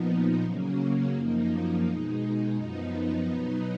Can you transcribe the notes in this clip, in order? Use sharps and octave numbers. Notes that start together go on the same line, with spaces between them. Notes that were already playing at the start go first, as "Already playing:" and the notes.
Already playing: A#2 F3 B3 D#4
C#3 F#3 A#3 C#4
F#2 F3 A#3 D#4
B2 G#3 D#4
F#2 F3 B3 D#4
B2 F#3 B3 D#4